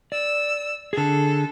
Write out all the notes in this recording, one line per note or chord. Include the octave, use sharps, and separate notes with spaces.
D5 E6
D3 G#4 A4